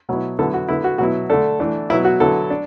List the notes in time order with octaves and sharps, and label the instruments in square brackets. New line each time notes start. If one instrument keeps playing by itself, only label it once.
[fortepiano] B2 F#3 B3 E4
D3 F#3 B3 E4 A4
F#4
D3 B3 E4
F#4
B2 F#3 B3 E4 F#4
D3 A3 D4 A4
E3 A3 D4
B2 F#3 B3 E4
F#4
D3 F#3 B3 E4 A4
D4